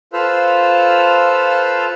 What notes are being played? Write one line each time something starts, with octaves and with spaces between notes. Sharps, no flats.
F4 A4 B4 C5 F5 E6